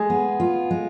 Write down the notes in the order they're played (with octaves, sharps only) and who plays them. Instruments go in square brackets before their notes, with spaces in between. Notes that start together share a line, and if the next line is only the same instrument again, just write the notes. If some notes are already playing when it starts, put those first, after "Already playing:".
Already playing: [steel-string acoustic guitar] G#3 [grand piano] G#4
[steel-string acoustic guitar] B3
F4
G#3